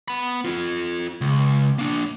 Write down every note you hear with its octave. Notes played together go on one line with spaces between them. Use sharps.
B3 B5
C4 F4
C#2
A#3 D4